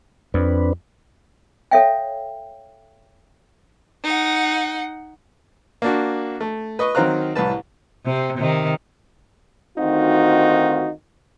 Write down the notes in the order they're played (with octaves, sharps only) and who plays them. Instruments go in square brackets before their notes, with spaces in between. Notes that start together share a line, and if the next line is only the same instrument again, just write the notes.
[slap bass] F2 [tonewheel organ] C4 D4 B4
[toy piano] A4 C#5 E5 F5 G5
[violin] D#4 F#5
[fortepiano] A#3 D4 F#4
A3
B4 D#5 C#6
D#3 F#3 C4 F5 A#5 F#6
C2 A2 B4 A5
[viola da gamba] C3 C4
C3 D#3
[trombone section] D2 D#3 C4 D#4 F4 F#4